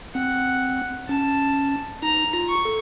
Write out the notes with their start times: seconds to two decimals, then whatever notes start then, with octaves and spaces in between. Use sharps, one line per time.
0.15 C4 F#5
1.09 C#4 A5
2.02 D#4 A#5
2.33 F4
2.49 C#6
2.65 A4